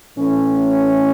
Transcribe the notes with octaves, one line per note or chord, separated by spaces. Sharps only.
A2 E3 A3 C#4